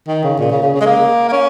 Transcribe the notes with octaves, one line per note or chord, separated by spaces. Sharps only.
D#3
C#3
A#2
C#3
C#3
C#3
G#3
A#3
A#3
C#4